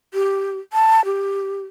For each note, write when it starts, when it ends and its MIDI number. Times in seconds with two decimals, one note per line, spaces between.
0.14 0.58 67
0.73 1.04 81
1.05 1.64 67